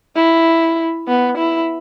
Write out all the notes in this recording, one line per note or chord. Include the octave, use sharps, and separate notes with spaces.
E4
B3
E4